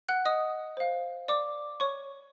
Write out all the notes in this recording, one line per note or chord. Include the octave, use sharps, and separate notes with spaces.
F#5 F#6
D#5 D#6
C5 F5
D5 D6
C#5 C#6